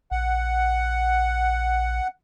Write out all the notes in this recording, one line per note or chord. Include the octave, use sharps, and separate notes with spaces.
A#1 F#5